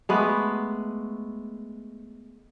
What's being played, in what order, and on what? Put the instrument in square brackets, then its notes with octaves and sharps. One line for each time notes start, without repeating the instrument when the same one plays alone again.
[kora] G#3 A3 B3 G4